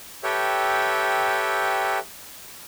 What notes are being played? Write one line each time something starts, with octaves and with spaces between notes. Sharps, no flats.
G4 A4 B4 C#5 E5 G5